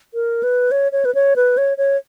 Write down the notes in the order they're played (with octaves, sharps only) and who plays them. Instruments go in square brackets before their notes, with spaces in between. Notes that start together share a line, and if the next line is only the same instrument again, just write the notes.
[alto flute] A#4
B4
C#5
C#5
B4
C#5
B4
C#5
C#5